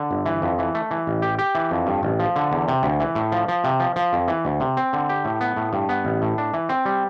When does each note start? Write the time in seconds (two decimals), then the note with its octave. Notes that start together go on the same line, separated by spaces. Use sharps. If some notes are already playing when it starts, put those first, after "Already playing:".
Already playing: D3
0.11 G1
0.26 E3
0.42 F2
0.59 E3
0.75 A3
0.91 E3
1.07 A1
1.22 G4
1.39 G4
1.55 E3
1.71 F2
1.87 G2
2.03 A1
2.20 F3
2.36 D3
2.52 E2
2.68 C3
2.83 D2
3.00 E3
3.15 A2
3.32 F3
3.48 F3
3.64 C3
3.80 F3
3.96 F3
4.13 F2
4.28 E3
4.45 D2
4.60 C3
4.77 C4
4.93 D3
5.09 G4
5.25 A2
5.41 B3
5.56 A2
5.73 G2
5.89 B3
6.05 A1
6.22 A2
6.38 D4
6.54 E3
6.69 C4
6.85 G3